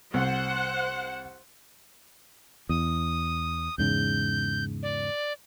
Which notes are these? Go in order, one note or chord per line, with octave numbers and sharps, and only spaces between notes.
C2 C5 F#5
E2 D#6
E2 G#2 C#3 G6
D5